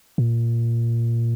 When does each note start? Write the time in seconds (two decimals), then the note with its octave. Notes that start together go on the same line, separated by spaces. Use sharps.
0.18 A#2